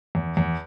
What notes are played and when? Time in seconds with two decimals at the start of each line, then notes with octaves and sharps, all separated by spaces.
0.15 E2
0.37 E2